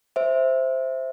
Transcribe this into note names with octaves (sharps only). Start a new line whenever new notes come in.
C5 E5